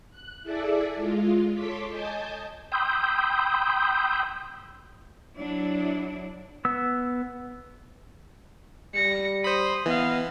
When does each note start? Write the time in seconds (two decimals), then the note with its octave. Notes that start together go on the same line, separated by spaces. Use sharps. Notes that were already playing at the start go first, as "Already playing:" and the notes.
0.10 F#6
0.43 E4 G#4 A4 D5 E5
0.96 G#3 F4
1.52 A4 C#5 C6 D6 B6
1.89 D#5 G#5 A5 G6
2.72 G5 B5 C6 D#6 E6 G6
5.36 F#3 D4 E4
6.65 B3 E6
8.95 G3 A#6 C#7
9.44 C5 B5 C6 D#6
9.86 E3 B3 D#5 F5